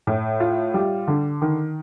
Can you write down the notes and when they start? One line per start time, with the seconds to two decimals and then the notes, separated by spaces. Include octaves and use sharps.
0.07 A2
0.40 F4
0.74 G3
1.08 D3
1.42 D#3